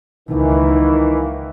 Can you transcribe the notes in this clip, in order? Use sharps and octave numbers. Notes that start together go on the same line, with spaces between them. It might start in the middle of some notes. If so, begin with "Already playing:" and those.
C#2 D#3 E3 A#3